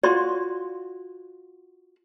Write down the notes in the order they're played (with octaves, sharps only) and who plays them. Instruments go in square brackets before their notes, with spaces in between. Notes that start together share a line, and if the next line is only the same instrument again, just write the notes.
[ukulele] F4 F#4 [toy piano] D5 C6